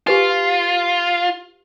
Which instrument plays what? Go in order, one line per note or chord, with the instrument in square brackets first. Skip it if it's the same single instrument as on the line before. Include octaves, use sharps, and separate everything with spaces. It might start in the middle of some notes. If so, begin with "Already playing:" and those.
[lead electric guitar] F4 [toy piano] G4 B4 G#5